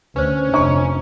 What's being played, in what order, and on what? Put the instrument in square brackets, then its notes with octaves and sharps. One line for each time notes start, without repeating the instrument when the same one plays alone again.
[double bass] D2 [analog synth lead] C#4 [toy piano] B4 C5
[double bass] F1 [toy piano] D4 A5 C6 [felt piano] D#5 A#5 C#6